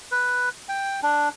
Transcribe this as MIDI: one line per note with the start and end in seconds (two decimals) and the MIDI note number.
0.12 0.49 71
0.69 1.00 79
1.03 1.29 62